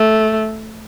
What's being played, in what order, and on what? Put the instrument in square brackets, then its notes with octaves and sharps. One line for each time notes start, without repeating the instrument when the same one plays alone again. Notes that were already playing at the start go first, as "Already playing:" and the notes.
Already playing: [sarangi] A3